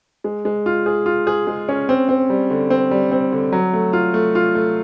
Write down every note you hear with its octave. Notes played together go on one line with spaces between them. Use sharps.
G#3
G#3
F4
G#4
F4
G#4
G#3
C#4
C4
C4
G3
D3
C4
G3
C4
D3
F#3
A3
F4
A3
F4
A3